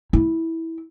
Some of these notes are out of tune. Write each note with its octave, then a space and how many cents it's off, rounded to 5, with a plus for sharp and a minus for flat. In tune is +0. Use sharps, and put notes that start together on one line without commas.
E4 -15